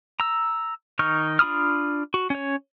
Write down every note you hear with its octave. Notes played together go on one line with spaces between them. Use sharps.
A#5 E6
D#3 D#4 C#6 F6
D4 F4 B5 D#6 F6
F#4
C#4 C#5